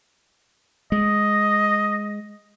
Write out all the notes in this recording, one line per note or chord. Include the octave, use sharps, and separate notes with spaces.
G#3 D#5